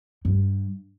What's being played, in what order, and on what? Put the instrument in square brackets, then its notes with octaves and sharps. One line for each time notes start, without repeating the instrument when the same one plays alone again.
[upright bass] G2